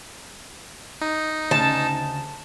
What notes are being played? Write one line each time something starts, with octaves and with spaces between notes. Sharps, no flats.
D#4
D2 C#3 A5